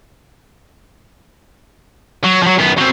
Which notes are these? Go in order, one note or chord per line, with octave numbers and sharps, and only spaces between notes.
F#3
F3 F#3
F#2 B3
F#3 C4